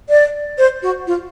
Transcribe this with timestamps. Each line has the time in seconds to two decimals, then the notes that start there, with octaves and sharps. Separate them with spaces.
0.09 D5
0.58 C5
0.82 F#4
1.07 F4